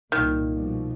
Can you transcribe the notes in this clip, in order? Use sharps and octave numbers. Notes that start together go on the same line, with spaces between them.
C2 A#2 D#3
B2 F3 G3